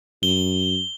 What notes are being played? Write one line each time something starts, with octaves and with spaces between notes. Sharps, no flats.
F#2 G7